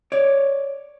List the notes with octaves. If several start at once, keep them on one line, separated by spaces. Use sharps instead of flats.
C#5 D5